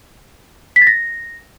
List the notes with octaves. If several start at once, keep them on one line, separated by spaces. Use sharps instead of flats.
B6
A6
A#6